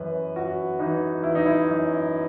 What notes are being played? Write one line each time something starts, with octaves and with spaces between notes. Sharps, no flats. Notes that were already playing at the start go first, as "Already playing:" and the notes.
Already playing: F#2 E3 B4
F#2 F#4
E3 D#4
E3 E4
D#4
E4
F#2